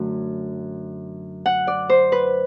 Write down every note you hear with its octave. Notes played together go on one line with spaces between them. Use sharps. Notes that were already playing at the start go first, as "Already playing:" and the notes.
Already playing: F#2 D3 F#3 A3
F#5
D5
C5
B4